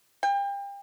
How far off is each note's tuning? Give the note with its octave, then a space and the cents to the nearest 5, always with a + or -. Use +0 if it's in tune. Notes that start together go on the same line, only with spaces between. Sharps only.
G5 +35